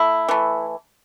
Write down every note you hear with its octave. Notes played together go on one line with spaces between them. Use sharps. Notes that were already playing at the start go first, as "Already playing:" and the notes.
Already playing: A3 E4
E3 A3